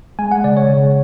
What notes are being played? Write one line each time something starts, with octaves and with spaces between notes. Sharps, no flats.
G#3 G#5
F#5
C#3 D5
C#5
C#3